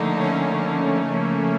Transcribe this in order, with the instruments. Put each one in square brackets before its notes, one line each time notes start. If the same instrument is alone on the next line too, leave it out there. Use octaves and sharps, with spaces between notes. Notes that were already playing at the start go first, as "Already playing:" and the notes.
Already playing: [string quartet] D3 F3 A#3 D#4 [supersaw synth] A3
[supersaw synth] C#4
[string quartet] C#3 F3 A#3